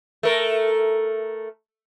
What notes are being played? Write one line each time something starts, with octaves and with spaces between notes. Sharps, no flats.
A3 A#4